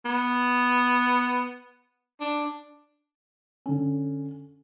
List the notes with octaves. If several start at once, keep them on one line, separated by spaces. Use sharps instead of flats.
B3
D4
D3 C#4